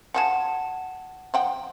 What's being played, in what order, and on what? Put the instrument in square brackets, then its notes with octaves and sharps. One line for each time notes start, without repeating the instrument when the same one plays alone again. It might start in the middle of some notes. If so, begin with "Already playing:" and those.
[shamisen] F3 F#4 G#4 [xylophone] F#5 A5
[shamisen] F3 F#5 G5